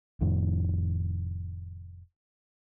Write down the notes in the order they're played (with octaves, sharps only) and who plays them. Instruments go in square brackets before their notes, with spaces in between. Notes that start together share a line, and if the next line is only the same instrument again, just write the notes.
[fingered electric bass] F1 F2 A2 D#3